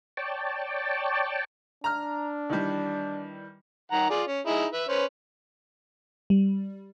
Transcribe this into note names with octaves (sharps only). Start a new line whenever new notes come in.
C#5 D5 G5 A5
D4 A#5 F6
D#3 E3 G3
D#3 F#5 A#5
F4 G#4 D5
C#4
D#4 E4 G#4
B4 E5
C#4 B4 C5
G3